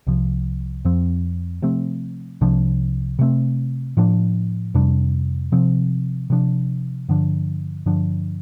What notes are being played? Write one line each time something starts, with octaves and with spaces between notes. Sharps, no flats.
C2 C3 F3
F2 F3 C4
C3 F3 A3 C4
C2 C3 F3 D4
C3 A3 C4
A2 F3 D4
F2 C3 G3 D4
C3 F3 C4
C3 F3 D4
G2 D3 F3 D4
G2 D3 F3 D4